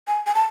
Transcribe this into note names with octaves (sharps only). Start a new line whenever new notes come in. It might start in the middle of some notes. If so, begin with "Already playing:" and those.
G#5
G#5
A5